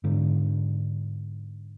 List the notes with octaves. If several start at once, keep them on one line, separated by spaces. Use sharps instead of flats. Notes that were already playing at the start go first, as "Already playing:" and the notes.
G#2 D3